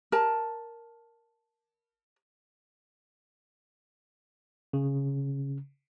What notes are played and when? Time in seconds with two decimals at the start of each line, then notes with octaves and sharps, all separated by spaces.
0.12 A#4 A5
4.73 C#3